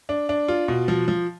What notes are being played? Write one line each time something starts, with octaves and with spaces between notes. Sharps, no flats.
D4
D4
F4
B2
F3
F3